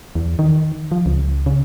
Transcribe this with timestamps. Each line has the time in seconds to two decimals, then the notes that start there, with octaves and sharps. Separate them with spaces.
0.15 E2
0.39 D#3
0.92 F3
1.06 C#2
1.46 C#3